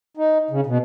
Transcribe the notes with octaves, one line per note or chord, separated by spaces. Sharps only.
D#4
C#3
B2